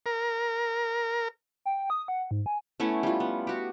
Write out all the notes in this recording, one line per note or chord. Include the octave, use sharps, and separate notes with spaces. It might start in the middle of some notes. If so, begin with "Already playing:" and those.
A#4
G5
D#6
F#5
G#2
G#5
A3 B3 C#4 E4
G3 F4
B3
F#4 G4